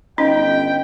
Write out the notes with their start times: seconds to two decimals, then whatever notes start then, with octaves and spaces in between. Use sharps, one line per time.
0.18 G1 C#4 D#4 D#5 G5